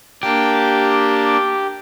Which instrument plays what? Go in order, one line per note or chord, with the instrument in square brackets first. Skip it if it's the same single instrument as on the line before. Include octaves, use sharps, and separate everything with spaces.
[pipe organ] A#3 D4 [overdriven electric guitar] G4